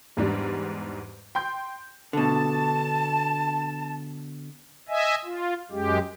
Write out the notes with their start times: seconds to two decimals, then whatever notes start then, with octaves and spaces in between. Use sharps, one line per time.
0.17 E2 G#2 G3 D4
1.35 G5 C6 G6
2.13 B2 D3 A5
4.88 D#5 E5 G#5
5.24 F4
5.71 F#2 G#3 G4